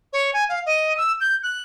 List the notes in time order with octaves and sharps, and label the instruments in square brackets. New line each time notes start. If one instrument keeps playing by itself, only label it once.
[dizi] C#5
G#5
F5
D#5
E6
G6
F#6